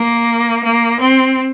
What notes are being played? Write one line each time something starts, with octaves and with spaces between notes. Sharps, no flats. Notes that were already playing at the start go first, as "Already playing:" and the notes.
Already playing: A#3
A#3
C4